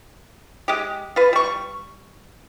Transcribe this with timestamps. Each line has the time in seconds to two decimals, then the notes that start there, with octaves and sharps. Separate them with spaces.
0.68 G#3 G4
1.16 F4 B4
1.33 G3 C#6